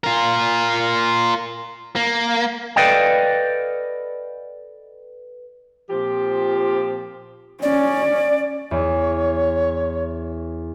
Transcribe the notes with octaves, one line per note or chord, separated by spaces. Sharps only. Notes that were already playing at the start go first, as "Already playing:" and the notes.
F4 A#4
A#3
A4 B4 D5 D#5 F5 G5
A#2 F3 C4 G4
C#4 D5
E2 C#5